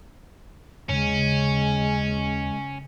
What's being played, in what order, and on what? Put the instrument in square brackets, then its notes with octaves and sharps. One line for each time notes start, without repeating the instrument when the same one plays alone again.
[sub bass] D#2 [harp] C#3 [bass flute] G#3 [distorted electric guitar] C#4